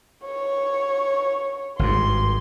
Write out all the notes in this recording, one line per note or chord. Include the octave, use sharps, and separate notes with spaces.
C#5
G#1 G2 C6